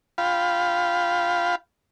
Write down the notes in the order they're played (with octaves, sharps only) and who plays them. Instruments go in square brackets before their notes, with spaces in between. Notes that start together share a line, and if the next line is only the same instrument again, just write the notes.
[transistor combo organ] F4 F5 G5 B5